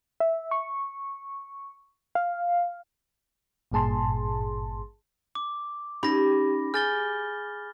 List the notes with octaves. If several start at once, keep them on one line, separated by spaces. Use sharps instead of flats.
E5
C#6
F5
G#1 G2 A#2 G#4 A5 C6
D6
C#4 D#4 G4 B5 A#6
G#4 G#5 F6 G6 A6 G7